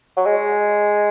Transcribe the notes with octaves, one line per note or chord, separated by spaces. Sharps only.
F#3
G#3